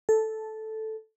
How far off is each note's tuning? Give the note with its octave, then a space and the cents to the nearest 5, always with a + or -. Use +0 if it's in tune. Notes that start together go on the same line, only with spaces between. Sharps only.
A4 -5